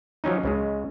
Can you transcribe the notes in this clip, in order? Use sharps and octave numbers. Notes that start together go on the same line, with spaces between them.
F3 F#3 C#4 D#4
C#2 C#3 G#3